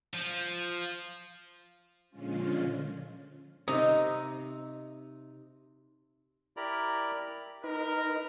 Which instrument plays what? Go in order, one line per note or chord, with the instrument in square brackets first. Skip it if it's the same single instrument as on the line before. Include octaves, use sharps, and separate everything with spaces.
[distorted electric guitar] F3
[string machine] A#2 D3 F3 G#3 C#4 F4
[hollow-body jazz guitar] C3 [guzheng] D#4
[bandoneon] E4 G4 A#4 D5 A#5 B5
[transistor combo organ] D#4 B4 [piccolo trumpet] A#4